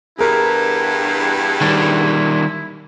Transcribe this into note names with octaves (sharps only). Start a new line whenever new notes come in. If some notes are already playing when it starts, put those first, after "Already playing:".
E2 G2 E4 G#4 A#4
D#3 G3 A6